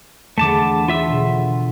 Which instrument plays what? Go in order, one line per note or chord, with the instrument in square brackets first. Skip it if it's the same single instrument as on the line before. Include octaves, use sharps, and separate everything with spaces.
[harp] E2 D3 [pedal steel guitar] A3 A5 D6
[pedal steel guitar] F4 E5 E6 [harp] C#5
[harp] B2 D3